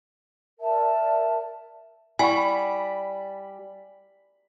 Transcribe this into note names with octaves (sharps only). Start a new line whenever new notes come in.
A#4 D5 E5 A5
G3 E4 F#5 G#5 B5 C#6